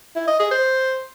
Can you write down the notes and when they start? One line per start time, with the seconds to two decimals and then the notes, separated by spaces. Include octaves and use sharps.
0.16 E4
0.28 D#5
0.39 G#4
0.51 C5